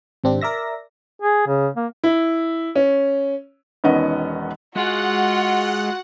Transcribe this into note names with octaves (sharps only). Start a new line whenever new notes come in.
G#1 C3 C4 D4 G4
A#4 D5 E5 A#6
G#4
C#3
A#3
E4
C#4
E1 D#3 B3 C#4 D#5 F#5
G#3 F4 F#4 F#5